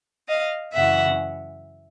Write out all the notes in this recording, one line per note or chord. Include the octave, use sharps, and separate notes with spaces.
D#5 F5
F#2 C#3 E3 E5 F#5